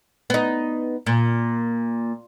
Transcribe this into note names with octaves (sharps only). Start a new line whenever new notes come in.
B3 D#4
A#2